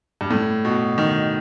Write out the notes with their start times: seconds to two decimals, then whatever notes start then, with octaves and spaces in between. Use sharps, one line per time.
0.21 G2
0.31 A2
0.65 B2
0.98 D#3